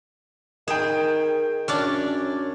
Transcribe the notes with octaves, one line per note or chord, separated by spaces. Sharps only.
D#3 G#4 G5 E7
F#2 C#4 D4 D5